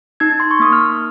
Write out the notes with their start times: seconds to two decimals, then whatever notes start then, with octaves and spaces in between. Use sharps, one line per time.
0.20 D#4 G#6
0.40 C6
0.51 C#6
0.59 A#3 D#6
0.72 F6